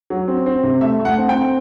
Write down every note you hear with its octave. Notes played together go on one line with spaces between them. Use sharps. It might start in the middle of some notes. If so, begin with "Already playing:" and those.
F#3
C4
C4
C3
A3 E5
A3
F#5
C4
G5
C4